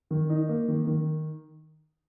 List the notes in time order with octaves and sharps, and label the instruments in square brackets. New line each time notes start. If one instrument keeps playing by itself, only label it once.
[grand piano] D#3
D#4
A#3
D#3
D#3